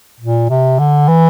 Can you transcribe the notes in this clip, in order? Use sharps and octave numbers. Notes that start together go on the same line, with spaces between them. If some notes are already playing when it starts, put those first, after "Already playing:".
A#2
C3
D3
E3